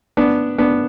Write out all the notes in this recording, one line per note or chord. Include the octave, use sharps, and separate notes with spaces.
B3 D4
B3 D4